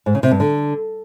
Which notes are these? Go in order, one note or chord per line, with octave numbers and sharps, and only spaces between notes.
G#2
C#3
C3
G2
D3